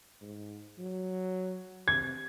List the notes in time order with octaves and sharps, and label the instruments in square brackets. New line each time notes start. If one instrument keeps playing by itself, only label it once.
[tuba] G#2
F#3
[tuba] C3 [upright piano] G#6